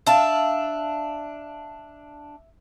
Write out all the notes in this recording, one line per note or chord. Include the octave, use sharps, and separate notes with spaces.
D4 E5 F5 A5